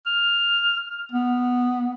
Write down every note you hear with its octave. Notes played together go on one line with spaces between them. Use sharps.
F6
B3